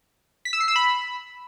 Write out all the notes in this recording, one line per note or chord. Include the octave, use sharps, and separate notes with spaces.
B6
E6
C7
E6
B5